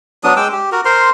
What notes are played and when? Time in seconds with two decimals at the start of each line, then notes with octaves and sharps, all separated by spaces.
0.24 F#3 B3 D4 D#6
0.37 G#3 G5 D6 E6
0.52 G4
0.72 F#4 A#4
0.85 A#4 C5 C6